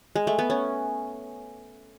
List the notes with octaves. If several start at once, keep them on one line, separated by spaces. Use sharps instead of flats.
G#3
A3
B3
C#4